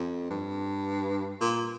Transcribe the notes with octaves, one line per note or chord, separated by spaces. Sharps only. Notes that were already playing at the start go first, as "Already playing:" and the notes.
Already playing: F2
G2
A#2